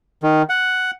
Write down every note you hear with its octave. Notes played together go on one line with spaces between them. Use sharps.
D#3
F#5